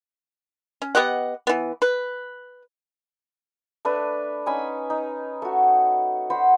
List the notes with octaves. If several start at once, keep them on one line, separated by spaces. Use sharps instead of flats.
C#4
B3 G4 D#5 F#5
E3 B3
B4
A3 D4 B4
C#4 D#4 G#5 B5
D#4
A3 F#4
F#4 C5 F#5 B5